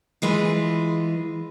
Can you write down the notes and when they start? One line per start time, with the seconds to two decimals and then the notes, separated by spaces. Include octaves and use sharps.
0.22 E3 G#3 F4